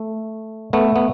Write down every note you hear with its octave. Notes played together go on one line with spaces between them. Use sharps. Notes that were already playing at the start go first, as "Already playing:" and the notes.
Already playing: A3
A3 B3
B3